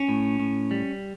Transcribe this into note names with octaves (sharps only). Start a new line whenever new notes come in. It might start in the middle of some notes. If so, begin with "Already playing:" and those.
Already playing: C#4
A2
A2
G3